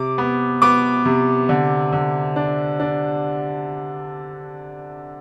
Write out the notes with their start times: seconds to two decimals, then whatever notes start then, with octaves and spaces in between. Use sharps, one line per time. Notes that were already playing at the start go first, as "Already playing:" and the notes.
Already playing: C3 D6
0.18 B3
0.62 B3 D6
1.05 C3
1.49 D3
1.92 D3
2.36 D4
2.80 D4